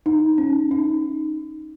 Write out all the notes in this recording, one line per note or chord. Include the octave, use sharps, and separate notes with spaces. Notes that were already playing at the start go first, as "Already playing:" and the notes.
D#4
C#4
D#4